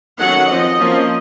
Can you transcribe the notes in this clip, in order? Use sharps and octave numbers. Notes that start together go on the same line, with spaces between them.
D#3 F#3 A3 C#4 F#5
F3 C4 D#5
F3 A#3 C#4